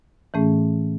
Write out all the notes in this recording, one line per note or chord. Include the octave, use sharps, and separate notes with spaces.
A2 E3 A3 C#4 G#4